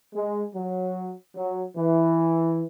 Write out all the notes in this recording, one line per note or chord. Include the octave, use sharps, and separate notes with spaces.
G#3
F#3
F#3
E3